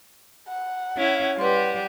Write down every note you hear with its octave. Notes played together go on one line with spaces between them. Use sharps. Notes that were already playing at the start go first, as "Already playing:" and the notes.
F#5
C#4 E4
G3 G4 B4 F#5 C6